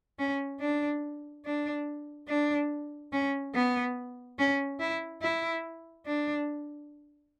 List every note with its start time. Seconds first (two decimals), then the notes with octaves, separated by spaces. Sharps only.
0.19 C#4
0.60 D4
1.45 D4
2.28 D4
3.13 C#4
3.54 B3
4.38 C#4
4.80 E4
5.22 E4
6.06 D4